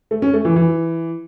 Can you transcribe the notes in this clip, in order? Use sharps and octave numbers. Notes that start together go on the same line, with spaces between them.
A3
C#4
A3
E3
E3